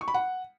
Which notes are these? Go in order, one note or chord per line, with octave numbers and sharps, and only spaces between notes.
C#6
B5
F#5